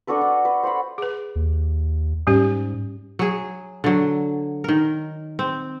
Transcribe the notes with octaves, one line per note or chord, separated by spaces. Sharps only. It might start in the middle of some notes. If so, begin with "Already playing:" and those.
D4 F#4 A4 B4
D4
B4
C5 F#5 B5
G#4 B4
D#2
G#2 G3 C#4 G4
F#3 G#4
D3 F#3
D#3 A#4
C4